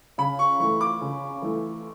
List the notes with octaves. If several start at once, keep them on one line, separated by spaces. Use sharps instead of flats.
C#3 B5
C#6
E3 A3 C#6
D6
C#3
E3 A3